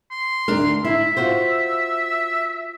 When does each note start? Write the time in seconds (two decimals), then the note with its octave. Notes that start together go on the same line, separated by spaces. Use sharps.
0.11 C6
0.48 D2 D4 A#4
0.84 E4 E5
1.17 F4 F#4 C5